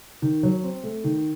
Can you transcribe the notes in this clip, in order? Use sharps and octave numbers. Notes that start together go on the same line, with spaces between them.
D#3
F#3
C4
A3
D#3